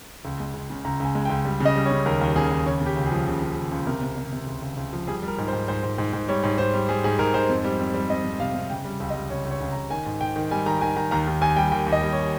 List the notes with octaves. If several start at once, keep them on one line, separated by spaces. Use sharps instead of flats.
C#2
G#3
C#2
C#3
C#2 A#5
C#2 G#5
G#3
G5
C#2
G3
C#3
D#5
G3
C#5
C#3
D#2 A#4
D#2
C#3 G#4
D#2
C#3 C#5
C#3 G4
C#2
G#4
F3
C#3
C#3
C#2
C#2
C3 A#4
C3
C3
C3
C#2
C#2
C#2
F3
G3 G#4
G3 A#4
G#2
C5
G#2
G#2 C5
G#2
G#2
G#2
G3 C#5
G#2
G#2 C5
G3
G3 G#4
G#2 G#4
G#2 A#4
G#2 C5
F2
G3
F2
G3
F2 D#5
F2
C3 F5
C3
C#3 G5
G3
C#2
D#5
G3
C#2 C#5
C#2
C#5
C#2
A#5
C#2
D#3 G#5
G#2
G#2 G5
D#3
G3 G#5
D#3 A#5
D#3 G#5
D#3 A#5
D#2 A#5
D#2
D#2 G#5
G3 G5
D#2 G5
D#2
D#5
G3
C#5